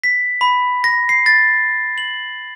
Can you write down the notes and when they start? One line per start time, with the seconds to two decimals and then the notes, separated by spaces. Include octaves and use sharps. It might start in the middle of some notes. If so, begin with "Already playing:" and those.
0.04 B6
0.41 B5
0.84 A#6
1.09 C7
1.26 A6
1.98 F#7